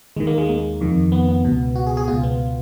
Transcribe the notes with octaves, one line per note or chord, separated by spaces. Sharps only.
D#2 D#3 G#3
A#3
G#3
A#3
F2 D#3
B3
B3
C#2 B2
F#4
G#4
G#4
C#2 B2 F4
B3